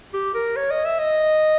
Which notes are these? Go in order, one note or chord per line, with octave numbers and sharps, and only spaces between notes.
G4
A#4
C#5
D#5
E5
D#5